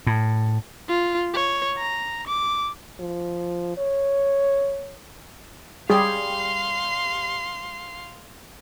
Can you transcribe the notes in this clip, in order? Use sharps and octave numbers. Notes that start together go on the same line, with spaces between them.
A2
F4
C#5
A#5
D6
F3
C#5
G3 G4 G#4 F5 C6